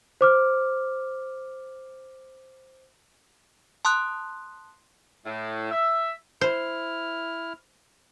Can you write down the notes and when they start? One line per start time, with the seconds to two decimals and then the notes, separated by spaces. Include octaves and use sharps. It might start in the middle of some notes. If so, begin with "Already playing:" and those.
0.21 C5 D6 F6
3.85 A5 C6 D#6 F#6
5.26 A2
5.71 E5
6.41 E4 C5 F6